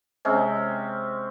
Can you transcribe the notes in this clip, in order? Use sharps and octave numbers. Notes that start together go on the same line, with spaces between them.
C3 G#3 C4 C#4